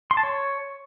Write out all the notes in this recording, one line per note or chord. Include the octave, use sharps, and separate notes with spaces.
C6
A5
C#5